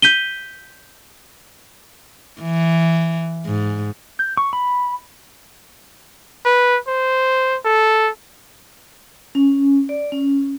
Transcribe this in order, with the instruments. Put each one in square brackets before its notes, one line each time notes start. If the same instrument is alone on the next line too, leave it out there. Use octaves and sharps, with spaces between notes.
[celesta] G6 B6 D#7 G7
[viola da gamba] E3
G#2
[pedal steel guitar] G6
C#6
B5
[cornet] B4
C5
A4
[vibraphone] C#4
D5
C#4